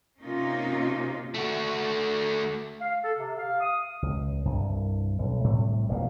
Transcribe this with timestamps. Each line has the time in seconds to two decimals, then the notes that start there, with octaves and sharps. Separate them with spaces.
0.22 C3 A#3 C#4 D#4 F4
1.34 A3 F#4
2.80 F5
3.03 A4
3.17 C3
3.37 F5
3.60 D#6
4.02 C#2
4.45 C2 G2
5.18 B1
5.44 A2 C3 G3 A3
5.89 E1 A#1 B2 A#3